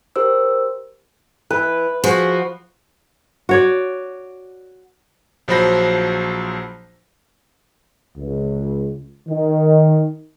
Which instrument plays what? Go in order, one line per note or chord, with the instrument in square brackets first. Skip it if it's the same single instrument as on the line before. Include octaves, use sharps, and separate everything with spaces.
[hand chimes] G4 A#4 C5 E6
[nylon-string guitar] E3 [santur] B4
[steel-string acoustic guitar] F3 [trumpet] F#4 [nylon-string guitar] G#4 C#5 G#5
[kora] F#4 C#5 D5
[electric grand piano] A#1 F3 F#3 C5 B5 A#6
[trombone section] C#2
D#3